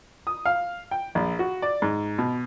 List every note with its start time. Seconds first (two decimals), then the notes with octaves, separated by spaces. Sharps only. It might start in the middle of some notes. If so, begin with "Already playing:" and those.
0.27 D#6
0.45 F5
0.91 G5
1.15 A#1
1.39 F#4
1.62 D5
1.82 G#2
2.18 B2